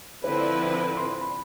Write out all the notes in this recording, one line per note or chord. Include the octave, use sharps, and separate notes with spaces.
D3 F3 C4 E4 B4 C5
D5
B5
B5
C6
B5